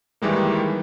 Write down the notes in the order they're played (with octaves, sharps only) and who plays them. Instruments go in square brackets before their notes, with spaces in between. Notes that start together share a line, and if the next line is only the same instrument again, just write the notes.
[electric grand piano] D#3 E3 G3 G#3 A#3